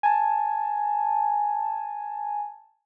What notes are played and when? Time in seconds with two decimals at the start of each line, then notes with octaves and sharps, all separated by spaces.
0.03 G#5 A5